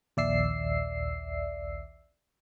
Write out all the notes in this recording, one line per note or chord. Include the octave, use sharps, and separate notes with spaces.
A#1 D#2 D5 E5 E6 C7